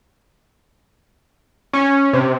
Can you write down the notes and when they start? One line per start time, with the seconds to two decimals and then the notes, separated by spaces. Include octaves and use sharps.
1.73 C#4
2.13 C3